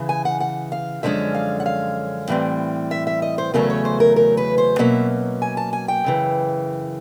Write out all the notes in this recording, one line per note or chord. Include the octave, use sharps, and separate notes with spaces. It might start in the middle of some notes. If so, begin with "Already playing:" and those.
Already playing: C#3 E3
G#5
F#5
F#5
F5
F#2 D3 F3 G#3 C#4 E5
F5
F#5
F5
A2 E3 G3 C4
E5
E5
D#5
C5
E2 C#3 F#3 A3 C#4 A#4
C#5
C5
A#4
A#4
B4
C5
B2 F#3 A#3 C#4 E5
G#5
A5
G#5
G5
F#2 C#3 E3